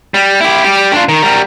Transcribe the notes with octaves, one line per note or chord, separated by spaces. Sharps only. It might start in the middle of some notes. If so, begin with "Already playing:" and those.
G3
E4 G4
G3 G4
D4 F4
D#3
G3 A#4